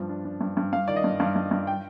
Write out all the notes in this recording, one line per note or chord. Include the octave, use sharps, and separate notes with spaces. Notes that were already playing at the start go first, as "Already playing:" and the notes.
Already playing: G2 F3
D4
D4
G2
G2
G2 F5
D#3 D5
D#5
G2
G2 F5
G2
G2
G5